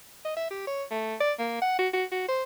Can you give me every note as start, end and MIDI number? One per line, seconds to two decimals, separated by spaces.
0.25 0.37 75
0.37 0.50 76
0.51 0.67 67
0.67 0.84 73
0.91 1.15 57
1.20 1.32 74
1.39 1.59 58
1.62 1.77 78
1.79 1.88 66
1.93 2.04 66
2.12 2.24 66
2.28 2.44 72